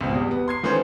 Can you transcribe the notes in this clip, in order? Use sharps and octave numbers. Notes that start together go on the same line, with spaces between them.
C#2 B2 C4
E2 G3
B3
C6 G#6 C7
D#3 E3 A3 C#4 C5